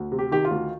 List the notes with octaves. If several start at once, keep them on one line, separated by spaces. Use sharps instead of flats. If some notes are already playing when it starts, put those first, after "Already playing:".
Already playing: D2
C3
G4
D#3 G4
F4
D2